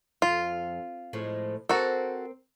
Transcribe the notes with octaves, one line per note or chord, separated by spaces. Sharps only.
F2 F4
A2 F3 G#3
C4 F#4 A4 A#4